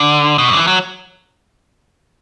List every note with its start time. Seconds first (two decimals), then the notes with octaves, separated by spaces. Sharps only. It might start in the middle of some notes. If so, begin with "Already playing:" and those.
Already playing: D3
0.38 B2
0.48 F#2
0.53 D3
0.57 E3
0.67 F#3